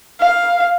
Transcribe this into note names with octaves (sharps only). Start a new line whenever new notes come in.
F5